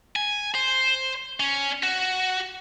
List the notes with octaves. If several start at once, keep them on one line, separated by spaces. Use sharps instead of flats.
G#5
C5
C#4
F#4